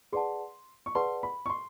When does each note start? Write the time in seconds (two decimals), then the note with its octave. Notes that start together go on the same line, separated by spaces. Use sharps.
0.13 G#4 B4 D5 F#5 A5 C6
0.86 C#6
0.95 G#4 B4 D5 F#5 A5 C6
1.23 B5
1.46 C#6
1.50 C6